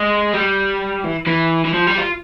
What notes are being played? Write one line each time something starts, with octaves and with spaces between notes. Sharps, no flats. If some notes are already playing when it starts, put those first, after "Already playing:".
Already playing: G#3
G3
E3
E3
E3
F3
G3
F4